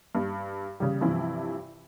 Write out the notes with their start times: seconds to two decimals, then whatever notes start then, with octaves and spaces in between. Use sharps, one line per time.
0.15 G2
0.80 C#3 G3
1.01 G2 C3 E3 F3 C4 E4